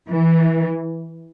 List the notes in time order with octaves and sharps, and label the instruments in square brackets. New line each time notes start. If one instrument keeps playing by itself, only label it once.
[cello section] E3